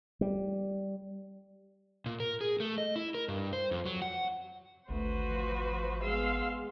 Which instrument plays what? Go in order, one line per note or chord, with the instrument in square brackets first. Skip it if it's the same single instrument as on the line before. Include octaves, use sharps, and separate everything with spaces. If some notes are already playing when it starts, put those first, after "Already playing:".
[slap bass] G3
[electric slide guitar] A#2
A#4
G#4
A3
D#5
E4
A#4
G2
C5
F2
F#3
F#5
[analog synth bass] G#1 [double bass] D2 [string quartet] F#4 B4 C5
[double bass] F3
[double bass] G#3 B3 [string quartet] F5 C6 E6